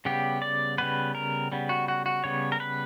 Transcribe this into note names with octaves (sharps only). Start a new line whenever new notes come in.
C#3 G3 B3 G4
D5
C#3 G3 B3 B4
A#4
C#3 G3 B3
F#4
F#4
F#4
C#3 G3 B3 C#5
A#4
B4